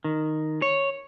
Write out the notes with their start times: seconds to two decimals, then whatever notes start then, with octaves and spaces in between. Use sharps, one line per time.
0.04 D#3
0.62 C#5